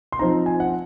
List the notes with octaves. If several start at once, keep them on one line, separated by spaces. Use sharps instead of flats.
C6
F3 C4 D#4 A#5
G#5
F#5